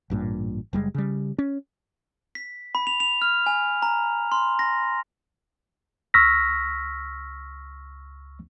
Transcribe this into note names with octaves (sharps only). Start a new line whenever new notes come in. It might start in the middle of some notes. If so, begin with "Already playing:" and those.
A1 G2 A#2
F#1 G3 G#3
C#3 G3
C#4
B6
B5
F7
F7
F6
G#5
A#5
C6
A#6
C#2 C#6 E6 F6 A#6 B6